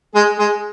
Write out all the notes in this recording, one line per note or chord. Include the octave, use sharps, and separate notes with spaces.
G#3 G#4
G#3 G#4